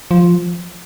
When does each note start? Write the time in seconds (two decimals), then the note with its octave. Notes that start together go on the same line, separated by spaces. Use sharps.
0.11 F3